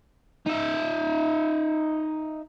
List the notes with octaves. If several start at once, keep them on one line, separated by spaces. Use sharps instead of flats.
D#4 E5